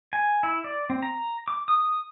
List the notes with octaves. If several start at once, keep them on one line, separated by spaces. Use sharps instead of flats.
G#5
E4
D5
C4
A#5
D6
D#6